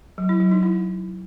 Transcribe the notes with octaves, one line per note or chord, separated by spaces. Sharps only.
F#3
E4
F#3
D#4
E4